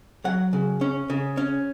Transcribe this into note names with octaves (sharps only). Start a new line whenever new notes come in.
F#3 F#5
C#3
C#4
C#3
C#4